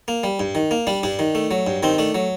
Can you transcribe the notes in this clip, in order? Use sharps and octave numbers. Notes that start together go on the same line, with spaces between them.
A#3
G3
G2
D#3
A#3
G3 D4
G2 D4
D#3
A3
F#3
G2
D#3 C4
A3 D4
F#3